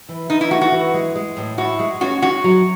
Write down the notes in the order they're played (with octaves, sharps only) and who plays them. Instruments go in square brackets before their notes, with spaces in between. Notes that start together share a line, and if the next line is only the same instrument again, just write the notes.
[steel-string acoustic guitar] E3
[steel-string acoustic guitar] E3 [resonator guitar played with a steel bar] D#4
[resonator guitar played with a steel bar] E4
[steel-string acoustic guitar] A3 [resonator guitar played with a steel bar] F#4
[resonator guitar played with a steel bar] F#4
[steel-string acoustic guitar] E3
G#3
G#3
A2
[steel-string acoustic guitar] E4 [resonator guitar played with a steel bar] F#4
[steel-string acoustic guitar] G#3
[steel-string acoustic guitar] C#4 [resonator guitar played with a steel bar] F#4
[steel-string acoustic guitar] G#3 [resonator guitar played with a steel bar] F#4
[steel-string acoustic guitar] F#3